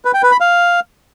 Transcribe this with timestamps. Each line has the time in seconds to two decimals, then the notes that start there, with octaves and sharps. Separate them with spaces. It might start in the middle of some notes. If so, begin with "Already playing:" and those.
0.05 B4
0.14 G5
0.23 B4
0.32 B5
0.40 F5